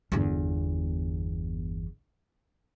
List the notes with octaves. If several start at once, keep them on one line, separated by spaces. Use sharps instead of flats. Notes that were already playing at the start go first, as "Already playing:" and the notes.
G1 E2